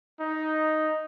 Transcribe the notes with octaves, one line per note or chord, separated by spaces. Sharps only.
D#4